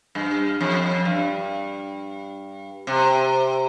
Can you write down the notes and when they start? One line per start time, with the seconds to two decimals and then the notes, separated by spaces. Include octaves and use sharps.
0.15 G2
0.61 F2
1.05 G2
2.87 C3